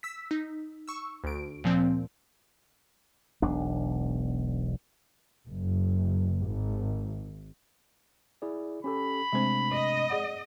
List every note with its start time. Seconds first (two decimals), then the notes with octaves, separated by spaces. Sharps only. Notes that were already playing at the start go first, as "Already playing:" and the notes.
0.03 E6 B6
0.31 D#4
0.88 C#6 E6
1.24 D2 D7
1.64 A#2 F3 C4
3.42 E1 B1 D4
5.49 F#1
6.46 G#1
8.42 E4 G#4 D5
8.84 C#4 G4 A4 B5
9.33 C3 G#3 A3 C4 D4 C5
9.73 D#5
10.10 G#4 D5 F#5